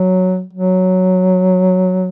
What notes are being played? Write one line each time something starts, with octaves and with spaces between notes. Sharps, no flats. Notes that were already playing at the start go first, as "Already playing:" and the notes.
Already playing: F#3
F#3